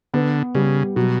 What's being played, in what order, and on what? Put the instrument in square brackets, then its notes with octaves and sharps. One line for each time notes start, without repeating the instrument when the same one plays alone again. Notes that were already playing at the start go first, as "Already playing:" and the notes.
[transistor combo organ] D3 [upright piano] B3
[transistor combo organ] C#3 [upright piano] G3
[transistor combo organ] B2 [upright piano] F#3